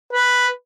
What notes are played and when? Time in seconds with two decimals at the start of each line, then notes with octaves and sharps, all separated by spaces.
0.13 B4